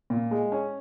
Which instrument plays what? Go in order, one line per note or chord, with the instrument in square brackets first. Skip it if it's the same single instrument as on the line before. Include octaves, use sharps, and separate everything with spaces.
[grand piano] A#2
G#3
C#4